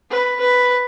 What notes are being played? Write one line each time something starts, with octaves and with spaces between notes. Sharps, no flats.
B4
B4